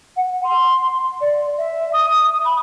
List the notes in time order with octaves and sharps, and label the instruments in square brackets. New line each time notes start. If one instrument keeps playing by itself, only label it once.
[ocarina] F#5
C6
D5
E5
D#6
B5